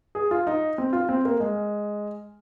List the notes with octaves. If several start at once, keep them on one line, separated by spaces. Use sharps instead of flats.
G#4
F4
D#4
C4
F4
C4
A#3
G#3